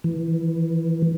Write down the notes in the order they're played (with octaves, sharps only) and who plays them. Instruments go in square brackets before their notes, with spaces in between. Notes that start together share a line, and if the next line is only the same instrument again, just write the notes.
[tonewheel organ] E3